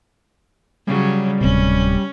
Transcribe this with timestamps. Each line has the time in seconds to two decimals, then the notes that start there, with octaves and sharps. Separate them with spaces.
0.87 C#3 F#3 G3
1.41 D1 C3 C#4